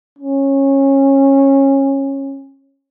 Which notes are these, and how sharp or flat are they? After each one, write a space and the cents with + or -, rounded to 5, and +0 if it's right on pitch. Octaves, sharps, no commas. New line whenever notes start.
C#4 -20